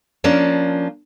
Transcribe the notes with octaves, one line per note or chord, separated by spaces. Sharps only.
F3 A#3 C#4 D4